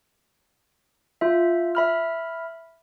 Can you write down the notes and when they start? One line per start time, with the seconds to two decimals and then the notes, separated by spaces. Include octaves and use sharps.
1.21 F4 E5
1.75 E5 B5 F6